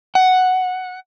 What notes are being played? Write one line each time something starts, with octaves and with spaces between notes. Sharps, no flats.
F#5